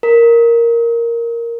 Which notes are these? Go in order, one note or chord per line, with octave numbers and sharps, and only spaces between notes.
A#4